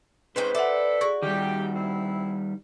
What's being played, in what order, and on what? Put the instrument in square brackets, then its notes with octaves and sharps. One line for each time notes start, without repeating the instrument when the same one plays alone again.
[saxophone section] G#2 [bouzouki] C4 C#4 G5 [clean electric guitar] B4 C5
[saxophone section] E4 A4 [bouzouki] D5 [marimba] E5 F#5
[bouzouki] F#4 [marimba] G#4 D5 C#6
[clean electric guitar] D#3 G3 [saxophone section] G4
[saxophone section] C4 E4